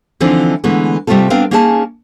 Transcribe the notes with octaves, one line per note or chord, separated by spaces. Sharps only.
D3 E3 F3 C4 D4 D#4
D3 E3 G#3 A3 B3
C3 G3 A3 C4 F4 A4
B3 C4 D4 A#4 F5
A#3 C#4 D#4 G#4 G5 A5